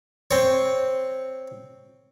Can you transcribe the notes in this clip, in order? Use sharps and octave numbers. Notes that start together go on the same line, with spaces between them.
C4 C#5